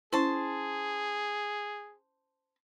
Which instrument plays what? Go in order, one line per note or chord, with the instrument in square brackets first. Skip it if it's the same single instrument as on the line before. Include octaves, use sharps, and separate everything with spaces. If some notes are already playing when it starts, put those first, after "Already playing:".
[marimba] C#4 E4 [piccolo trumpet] G#4 [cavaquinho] C5 A5